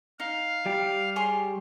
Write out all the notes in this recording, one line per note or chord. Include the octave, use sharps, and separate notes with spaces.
D#4 F5
G3 G4
G#4 C#5 C6